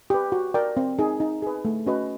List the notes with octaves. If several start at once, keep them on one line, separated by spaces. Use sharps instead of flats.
G4 B4
F#4
A#4 D5 G5
C4
D#4 G#4
D#4
G#4 B4
A3
C#4 F#4 B4 D#5